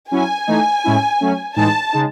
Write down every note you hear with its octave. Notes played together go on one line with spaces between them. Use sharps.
F#3 C#4 E4 G#5
E3 A3 D#4
A2 G#3 C#4 E4
F#3 A3 C#4
A2 E3 G#3 D#4 A5
C#3 G#3 D#4